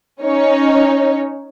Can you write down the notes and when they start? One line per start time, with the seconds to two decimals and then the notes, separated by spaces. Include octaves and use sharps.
0.21 C#4 D#4 C#5